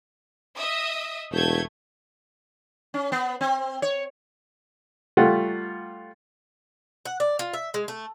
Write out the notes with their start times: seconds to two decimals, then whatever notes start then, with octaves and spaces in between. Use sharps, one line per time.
0.57 D#5 E5 D#6
1.32 E1 A3 G6 G#6
2.94 C#4
3.12 B3
3.41 C4
3.82 C#5
5.17 G3 A3 F4 F#5
7.05 F#5
7.20 D5
7.39 F4
7.53 E5
7.74 G#3
7.88 A3